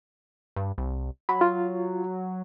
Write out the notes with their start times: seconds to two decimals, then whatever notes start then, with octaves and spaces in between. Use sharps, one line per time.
0.56 G2
0.78 C2
1.29 F#3 B5
1.41 F4